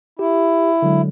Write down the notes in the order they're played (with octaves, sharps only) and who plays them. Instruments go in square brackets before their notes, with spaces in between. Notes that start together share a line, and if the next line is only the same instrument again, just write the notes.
[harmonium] E4 [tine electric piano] G4
[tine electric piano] D3 F#3 G#3